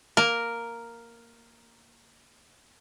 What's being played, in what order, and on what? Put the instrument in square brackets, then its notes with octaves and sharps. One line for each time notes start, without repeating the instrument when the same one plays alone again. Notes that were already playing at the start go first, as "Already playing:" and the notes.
[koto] A#3 [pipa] A#4